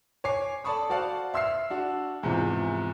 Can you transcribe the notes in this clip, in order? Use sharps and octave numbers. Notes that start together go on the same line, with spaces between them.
C#5 G#5 D6 C7
A4 D5 A5 B5 C#6 D#6
F#4 C5 D5 F5 F#5 A5
E5 C6 E6 F6 C7
D4 F#4
E2 G#2 C3 E3 F3